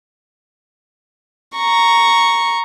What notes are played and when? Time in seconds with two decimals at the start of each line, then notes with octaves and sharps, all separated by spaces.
1.57 A#5 C#6